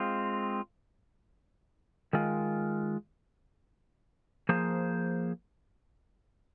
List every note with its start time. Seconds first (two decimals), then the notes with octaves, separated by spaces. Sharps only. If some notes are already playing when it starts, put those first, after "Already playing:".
Already playing: G#3 C4 F4
2.13 D#3 G#3 F4
4.49 F3 A#3 G#4 C5